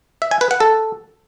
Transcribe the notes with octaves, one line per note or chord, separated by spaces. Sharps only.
E5
G#5
B4
F#5
A4